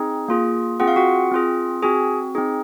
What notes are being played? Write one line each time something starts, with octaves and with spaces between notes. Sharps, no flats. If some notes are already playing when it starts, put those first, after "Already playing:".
Already playing: C4 D#4 G#4
A#3 F4 G#4
C4 F4 G#4 F#5
F5
F#4 F#5
C4 F4 G#4
C4 F#4 G#4 G#5
C4 D#4 G#4